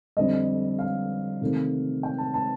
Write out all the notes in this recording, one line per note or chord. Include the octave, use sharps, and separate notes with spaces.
F2 D3 G3 C4 D#5
F5
C3 D#3 A3 C4
G5
A5
A5